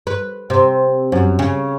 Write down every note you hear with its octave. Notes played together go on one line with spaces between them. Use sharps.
B4
C3
F#2
C#3